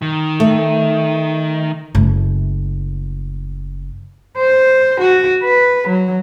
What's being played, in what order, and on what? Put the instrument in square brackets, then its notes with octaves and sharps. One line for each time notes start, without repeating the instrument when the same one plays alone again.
[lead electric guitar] D#3
[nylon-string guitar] A3
[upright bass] F#1 A3
[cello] C5
F#4
B4
F#3